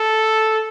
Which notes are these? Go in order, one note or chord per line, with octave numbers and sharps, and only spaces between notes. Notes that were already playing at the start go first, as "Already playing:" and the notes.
Already playing: A4